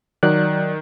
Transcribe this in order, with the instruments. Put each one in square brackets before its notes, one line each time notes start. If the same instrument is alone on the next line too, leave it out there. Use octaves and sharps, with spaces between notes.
[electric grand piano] D#3 [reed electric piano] F#3 D5 F#6